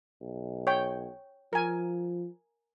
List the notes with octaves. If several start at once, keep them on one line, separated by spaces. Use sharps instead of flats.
B1
C#5 G5
F3 A#4 G#5